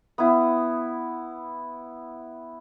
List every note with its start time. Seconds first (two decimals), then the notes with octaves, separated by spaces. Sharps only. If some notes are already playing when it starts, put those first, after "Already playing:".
0.18 B3 E4